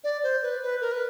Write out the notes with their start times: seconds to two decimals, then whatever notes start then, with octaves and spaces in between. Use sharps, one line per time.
0.04 D5
0.23 C5
0.43 B4
0.62 B4
0.81 A#4
0.92 B4